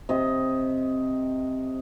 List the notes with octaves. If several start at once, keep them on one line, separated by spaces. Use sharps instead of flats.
C3 D#5